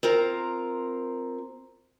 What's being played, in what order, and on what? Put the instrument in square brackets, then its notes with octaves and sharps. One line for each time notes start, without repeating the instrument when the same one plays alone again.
[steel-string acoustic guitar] C4 F4 A#4 A#5